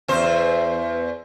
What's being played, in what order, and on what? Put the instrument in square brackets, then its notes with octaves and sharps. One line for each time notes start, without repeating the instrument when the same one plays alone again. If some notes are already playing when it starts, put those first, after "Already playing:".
[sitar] E2 C5